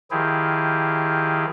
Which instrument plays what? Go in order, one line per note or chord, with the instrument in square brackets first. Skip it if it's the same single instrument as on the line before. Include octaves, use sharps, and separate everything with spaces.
[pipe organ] D#3 F3 E4 G4 G#4